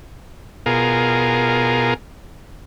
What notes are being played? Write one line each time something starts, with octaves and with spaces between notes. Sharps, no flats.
B2 F4 G#4 A#4